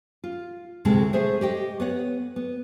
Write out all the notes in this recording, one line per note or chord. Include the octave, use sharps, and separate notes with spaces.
F4
D2 A2 C3 G#3 A4 A5
A3 G#4 C5 E5
G4 D#5 G5
B3 C#5 F#5
B3